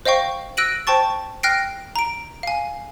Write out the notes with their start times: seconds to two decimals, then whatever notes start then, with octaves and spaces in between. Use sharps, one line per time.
0.05 C5 D#5 F5 G5 C#6
0.57 E6 F#6 A#6 D7 D#7 F#7
0.87 C5 G5 A5 C#6 A6
1.43 G5 F6 F#6 A#6 C7 D7
1.96 A#5 D7
2.43 F5 G#5